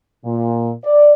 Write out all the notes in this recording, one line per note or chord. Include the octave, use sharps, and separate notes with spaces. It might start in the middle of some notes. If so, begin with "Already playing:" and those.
A#2
D5